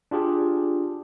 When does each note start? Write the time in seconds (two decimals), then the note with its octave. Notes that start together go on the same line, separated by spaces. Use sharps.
0.11 D4 F4 G4 G#4